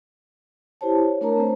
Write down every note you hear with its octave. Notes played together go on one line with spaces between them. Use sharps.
E4 G4 C5 C#5 A5
C#5
A3 D4 A#4 C#5 A5 A#5
C4 C5